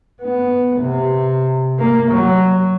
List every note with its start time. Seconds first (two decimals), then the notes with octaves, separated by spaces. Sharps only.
0.22 B3
0.81 C3
1.79 A#3
2.11 F#3